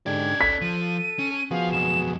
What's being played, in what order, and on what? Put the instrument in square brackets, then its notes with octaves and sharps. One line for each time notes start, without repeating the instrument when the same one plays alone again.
[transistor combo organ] G#2 D3 G4 [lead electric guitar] C#4 D5 [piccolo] G#6
[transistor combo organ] A4 [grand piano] B6
[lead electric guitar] F3 [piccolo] D#7
[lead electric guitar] C#4
[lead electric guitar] F3 [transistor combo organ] B3 F#4 G#4 [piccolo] F5
[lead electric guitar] B1 F2 [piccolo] E7